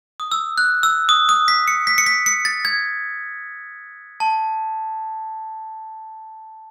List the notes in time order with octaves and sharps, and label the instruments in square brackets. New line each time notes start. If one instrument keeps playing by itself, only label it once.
[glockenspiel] D#6
E6
F#6
E6
D#6
D#6
B6
C#7
B6
C#7
B6
C#7
A6
G#6
A5